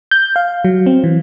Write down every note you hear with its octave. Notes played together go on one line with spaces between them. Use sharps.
G6
F5
F#3
C4
E3